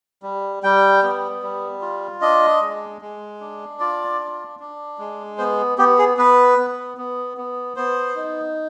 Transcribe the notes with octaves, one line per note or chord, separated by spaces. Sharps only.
G3
G3 G5
B3
G3
F4
D4 D#5
G#3
G#3
D4
F4 D5
D4
D4
G#3
B3 C5
B3 G4
G#4
B3 B4
B3
B3
B3
B3 C5
D#4